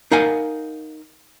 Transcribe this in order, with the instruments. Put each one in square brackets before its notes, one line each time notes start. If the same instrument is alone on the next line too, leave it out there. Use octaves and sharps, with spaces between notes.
[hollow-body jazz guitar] D#4 A#4 F5 F#5 G#5